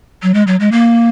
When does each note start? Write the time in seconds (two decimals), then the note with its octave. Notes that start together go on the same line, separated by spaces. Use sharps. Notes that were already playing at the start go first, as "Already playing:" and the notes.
0.23 F#3
0.34 G#3
0.47 F#3
0.60 G#3
0.72 A#3